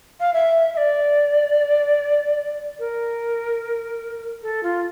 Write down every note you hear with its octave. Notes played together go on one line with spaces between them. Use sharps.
F5
E5
E5
D5
A#4
A4
F4